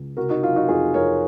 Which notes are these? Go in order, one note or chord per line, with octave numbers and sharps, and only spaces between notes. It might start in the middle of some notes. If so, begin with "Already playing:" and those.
Already playing: C#2
C3 F#4 A#4
D#4 F#4
F#3 F4
D#4 F#4
F2 F4 G#4
F2 A#4 C#5